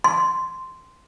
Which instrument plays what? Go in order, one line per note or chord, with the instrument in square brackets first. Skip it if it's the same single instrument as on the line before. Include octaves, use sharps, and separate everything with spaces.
[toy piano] C6